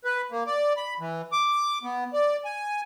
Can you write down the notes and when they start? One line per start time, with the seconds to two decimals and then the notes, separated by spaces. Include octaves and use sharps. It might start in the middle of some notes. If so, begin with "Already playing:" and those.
0.05 B4
0.31 A#3
0.46 D5
0.77 B5
1.00 E3
1.32 D6
1.83 B3
2.13 D5
2.45 G#5